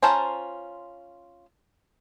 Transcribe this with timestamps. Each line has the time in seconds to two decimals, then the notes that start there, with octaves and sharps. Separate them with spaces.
0.03 C#4 F4 C5 A5 A#5